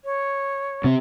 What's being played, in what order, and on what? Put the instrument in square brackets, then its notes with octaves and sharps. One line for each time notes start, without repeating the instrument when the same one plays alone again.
[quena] C#5
[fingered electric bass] C3 C4